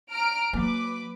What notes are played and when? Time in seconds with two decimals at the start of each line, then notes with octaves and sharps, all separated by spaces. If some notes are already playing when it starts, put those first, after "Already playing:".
0.11 A#5 F6 D7
0.53 F#3 A#3 B4 D6